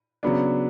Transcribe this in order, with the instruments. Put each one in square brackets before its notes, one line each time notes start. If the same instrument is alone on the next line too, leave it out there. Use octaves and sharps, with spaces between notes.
[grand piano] C#3 F#3 B3 D4